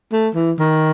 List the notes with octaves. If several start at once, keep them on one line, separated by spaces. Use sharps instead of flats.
A3
E3
D#3